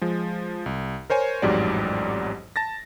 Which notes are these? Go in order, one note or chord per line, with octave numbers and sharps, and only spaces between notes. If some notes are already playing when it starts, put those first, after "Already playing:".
F3 G#3
C2
A#4 C5 C#5 G#5
A1 F2 G#2 F#3 G4 D5
A5 A6 A#6